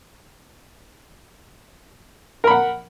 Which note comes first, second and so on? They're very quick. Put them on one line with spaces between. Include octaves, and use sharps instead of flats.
A#4 B5 F#5